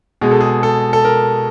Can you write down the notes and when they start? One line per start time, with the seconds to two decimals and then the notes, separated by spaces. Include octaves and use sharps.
0.21 B2 G#3 G#4
0.31 A4
0.41 G#4
0.63 A4
0.93 A4
1.05 A#4